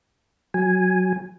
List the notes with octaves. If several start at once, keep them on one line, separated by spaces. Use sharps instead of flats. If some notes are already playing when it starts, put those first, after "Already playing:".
F#3 G#5